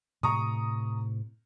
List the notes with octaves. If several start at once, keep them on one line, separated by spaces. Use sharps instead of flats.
A2 C3 A#5 C#6 D#6